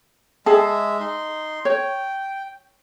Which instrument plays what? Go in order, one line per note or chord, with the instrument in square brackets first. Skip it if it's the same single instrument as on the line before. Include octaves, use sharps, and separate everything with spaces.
[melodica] G#3 E5 [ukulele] G#4 A5
[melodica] D#4 C6
[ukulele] C#5 [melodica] G5